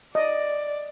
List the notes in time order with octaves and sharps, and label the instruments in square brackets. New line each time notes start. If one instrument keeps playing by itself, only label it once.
[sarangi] D5 [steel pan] D#5